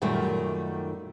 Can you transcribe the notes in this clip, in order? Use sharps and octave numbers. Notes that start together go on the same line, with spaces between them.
F#2 A#2 D#3 G3 A3